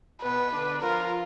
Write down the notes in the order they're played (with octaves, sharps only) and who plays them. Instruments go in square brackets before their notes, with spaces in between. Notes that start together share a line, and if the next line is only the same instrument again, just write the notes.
[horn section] B2 B3 [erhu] B4
[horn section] D3 D4
[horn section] F3 F4 [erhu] A#4